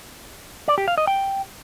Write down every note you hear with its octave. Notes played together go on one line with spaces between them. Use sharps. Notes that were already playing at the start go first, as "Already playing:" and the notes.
D5
G4
F5
D#5
G5